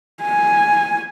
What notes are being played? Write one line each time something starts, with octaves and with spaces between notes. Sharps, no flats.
G#5